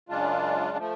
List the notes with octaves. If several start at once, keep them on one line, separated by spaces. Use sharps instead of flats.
F#2 C#3 G#3 D4 F4
F3 A3